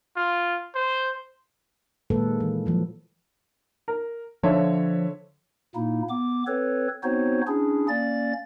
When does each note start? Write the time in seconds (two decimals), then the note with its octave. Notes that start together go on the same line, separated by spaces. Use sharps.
0.16 F4
0.75 C5
2.10 A#2 D#3 G#3 A#3 A4 B4
2.40 E3
2.66 F3 F#3 A#3
3.88 A#4
4.43 D3 F3 C#5 E5
5.75 A#2 A#3 D#4 E4
6.09 B3 D6
6.47 C4 A4 B4 C#5
7.03 B3 C4 D#4 F#4 C5 C#5
7.47 C#4 D4 E4 G#4
7.89 A#3 C#4 D5 A6